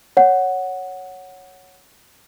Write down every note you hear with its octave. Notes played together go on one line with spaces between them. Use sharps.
C#5 F#5